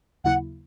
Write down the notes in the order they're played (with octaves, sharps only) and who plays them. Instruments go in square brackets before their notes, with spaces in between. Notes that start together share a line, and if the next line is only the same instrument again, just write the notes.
[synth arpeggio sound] D#2 C#3 F#3 A#3 E4 [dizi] F#5